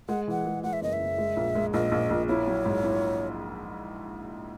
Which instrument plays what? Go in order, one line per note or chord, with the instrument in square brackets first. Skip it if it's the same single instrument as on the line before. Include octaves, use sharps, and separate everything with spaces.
[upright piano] G#3 [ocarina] F#5
[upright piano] E3 [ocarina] F#5
[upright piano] G#3
[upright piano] G#3 [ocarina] F#5
[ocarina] E5
[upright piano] F#1 [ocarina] D#5
[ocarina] E5
[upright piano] F#1
G#3
A#1
G#3
[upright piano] A#1 [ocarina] D#5
[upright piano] A#1
A#1
[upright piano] E4 [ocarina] C#5
[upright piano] F#3
G#2
E4